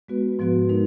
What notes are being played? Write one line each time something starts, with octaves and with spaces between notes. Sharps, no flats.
G#3 B3 F#4 B4
G#2 F3 B3 F#4 B4
G#3 D#4 A#4